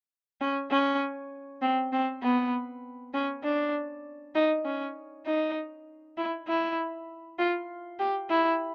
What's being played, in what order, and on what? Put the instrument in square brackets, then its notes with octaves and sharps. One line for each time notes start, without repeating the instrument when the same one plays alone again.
[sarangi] C#4
C#4
C4
C4
B3
C#4
D4
D#4
C#4
D#4
E4
E4
F4
G4
E4